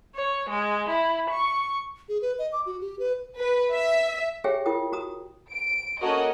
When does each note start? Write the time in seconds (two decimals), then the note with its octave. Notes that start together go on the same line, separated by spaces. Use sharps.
0.15 C#5
0.51 G#3
0.89 E4
1.29 C#6
2.09 G#4
2.22 B4
2.39 D#5
2.52 D6
2.66 F#4
2.81 G4
2.99 B4
3.37 B4
3.73 E5
4.44 G4 G#4 C#5 E5 G5 G#5
4.66 E4 F4 A#4 G5 D#6
4.92 F#4 A#5 D#6
5.50 D7
6.00 A#3 C#4 F#4 A4 A#4 D#5